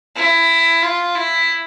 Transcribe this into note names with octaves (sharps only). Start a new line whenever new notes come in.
E4
F4
E4